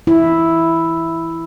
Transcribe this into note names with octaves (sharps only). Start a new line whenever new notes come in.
E4